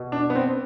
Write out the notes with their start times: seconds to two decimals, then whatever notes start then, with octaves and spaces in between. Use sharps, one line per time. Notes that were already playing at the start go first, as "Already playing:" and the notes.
Already playing: B2
0.12 D4
0.30 B3
0.35 C4